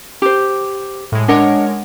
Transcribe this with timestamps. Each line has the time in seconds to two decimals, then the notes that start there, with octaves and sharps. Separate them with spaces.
0.22 G4 C5
1.12 A2 G#3
1.28 G#3 D4 A#4 C#5 D#5 F#5